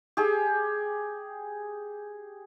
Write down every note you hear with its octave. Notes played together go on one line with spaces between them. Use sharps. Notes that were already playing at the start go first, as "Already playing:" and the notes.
G4 G#4